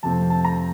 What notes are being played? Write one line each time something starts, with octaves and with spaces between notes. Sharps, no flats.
F2 C3 F3 A3 C4 A5
A5
A#5